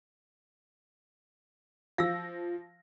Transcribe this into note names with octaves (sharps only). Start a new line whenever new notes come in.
F3 F5 E6 A#6